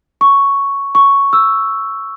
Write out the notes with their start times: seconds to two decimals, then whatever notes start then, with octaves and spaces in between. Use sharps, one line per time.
0.21 C#6
0.95 C#6
1.33 E6